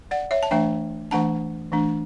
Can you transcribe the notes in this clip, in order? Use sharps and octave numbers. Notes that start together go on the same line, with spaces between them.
D5 F#5
C#5 E5
A5
E3 A3 D4 E5 G5
E3 A3 D4 F#5 A5
E3 A3 D4